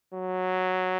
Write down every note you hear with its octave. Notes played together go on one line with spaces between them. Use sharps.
F#3